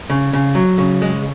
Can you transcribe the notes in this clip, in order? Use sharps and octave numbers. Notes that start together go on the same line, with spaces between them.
C#3
C#3
F#3
C#3
G#3